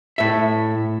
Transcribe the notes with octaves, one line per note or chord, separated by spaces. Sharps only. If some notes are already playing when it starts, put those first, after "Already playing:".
A2 E5